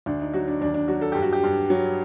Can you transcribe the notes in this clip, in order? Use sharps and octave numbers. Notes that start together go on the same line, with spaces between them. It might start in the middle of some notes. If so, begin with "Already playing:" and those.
D2 D4
D#4
F#3 F#4
D4
D#2 D4
D4
F#3 F#4
A4
G2 G4
F#4
G4
G2
F#3